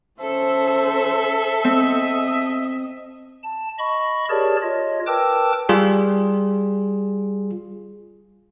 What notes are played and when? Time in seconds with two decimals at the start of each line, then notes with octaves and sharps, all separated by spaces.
0.21 C#4 A4 C5 E5
1.64 C4 D#5
3.43 A5
3.79 D#5 B5 C#6
4.30 G4 G#4 A#4 C#5 D5 A5
4.62 F4 C#5 D#5
5.07 A#4 B4 G5 A5 D6 E6
5.69 G3 F4 G#4